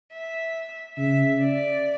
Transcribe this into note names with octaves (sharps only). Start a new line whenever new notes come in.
E5
C#3 E5
D5